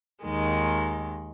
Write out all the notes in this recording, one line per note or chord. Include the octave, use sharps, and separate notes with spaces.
D#2 D#3 G#3